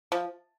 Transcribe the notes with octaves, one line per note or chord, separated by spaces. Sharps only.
F3